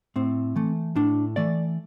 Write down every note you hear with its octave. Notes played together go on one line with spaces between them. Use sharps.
A2 C4
E3 A3
A2 D4
E3 A3 D5